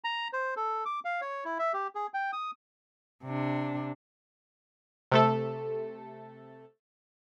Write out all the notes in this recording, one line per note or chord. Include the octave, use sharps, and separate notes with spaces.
A#5
C5
A4
D6
F5
C#5
E4
E5
G4
G#4
G5
D#6
C3 D4
C3 A3 A4